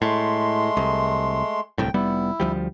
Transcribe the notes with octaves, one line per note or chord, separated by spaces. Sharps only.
A2 G#3 A3 C6
C2
D1 C2 A2 G5
F1 G3 B3 E4
D2 F3 G3